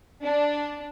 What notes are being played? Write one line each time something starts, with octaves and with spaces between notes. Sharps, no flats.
D4